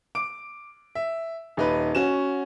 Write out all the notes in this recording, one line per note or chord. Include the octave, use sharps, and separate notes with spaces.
D6 D7
E5
D#1 D#4 B4
C#4 F#4 E7